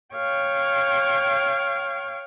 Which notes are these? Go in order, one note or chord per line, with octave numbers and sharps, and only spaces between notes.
C#5 F5 G5 C#6